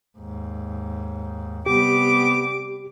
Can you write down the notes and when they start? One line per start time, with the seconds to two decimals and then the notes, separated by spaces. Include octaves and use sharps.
0.18 D#2 G#2
1.66 C3 G3 B3 G4 D6